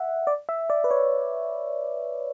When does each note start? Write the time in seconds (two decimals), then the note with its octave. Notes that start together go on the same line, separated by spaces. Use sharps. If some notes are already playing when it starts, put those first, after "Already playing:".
Already playing: E5 F#5
0.27 D5
0.49 E5
0.70 D5
0.84 B4
0.91 C#5